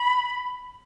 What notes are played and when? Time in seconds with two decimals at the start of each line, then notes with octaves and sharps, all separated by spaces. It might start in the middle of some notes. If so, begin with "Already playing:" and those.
Already playing: B5